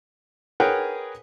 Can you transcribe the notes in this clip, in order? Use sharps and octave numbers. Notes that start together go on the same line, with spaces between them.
G#4 A#4 B4 C#5 F#5 G5